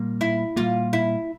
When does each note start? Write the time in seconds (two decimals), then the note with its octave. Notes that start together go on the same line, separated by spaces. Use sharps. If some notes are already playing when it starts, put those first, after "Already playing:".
Already playing: A#2 G3 A#3
0.21 E4
0.56 A#2 G3 A#3 F4
0.93 E4